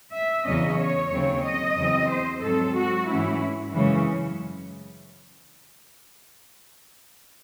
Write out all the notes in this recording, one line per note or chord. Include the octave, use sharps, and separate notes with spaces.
E5
E2 C#3 F#3 C#4 D#5
C#5
D#2 C#3 F#3 C4
D#5
E2 C#3 F#3 C4
C5
G#2 F#3 C4 A4
F#4
G#2 E3 A3 C#4 E4
F#2 C#3 E3 G#3 C#4